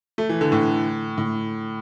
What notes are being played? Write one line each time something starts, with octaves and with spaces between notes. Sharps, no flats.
A3
E3
D3
A2
A2